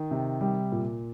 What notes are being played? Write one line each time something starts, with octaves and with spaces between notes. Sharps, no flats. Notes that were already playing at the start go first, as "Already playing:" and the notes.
Already playing: D#3
C3
G3
A#2